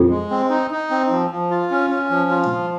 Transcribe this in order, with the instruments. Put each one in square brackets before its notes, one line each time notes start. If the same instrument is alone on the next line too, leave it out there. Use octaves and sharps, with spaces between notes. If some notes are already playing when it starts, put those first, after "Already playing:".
Already playing: [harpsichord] F2
[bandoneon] G#3
C4
D#4
D#4
C4
F3
F3
F4
C#4
C#4
F3
F4
F3